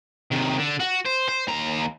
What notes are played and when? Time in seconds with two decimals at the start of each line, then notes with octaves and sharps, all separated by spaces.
0.32 C3 D#3
0.59 D3
0.80 F#4
1.06 C5
1.29 C5
1.48 D#2 A#5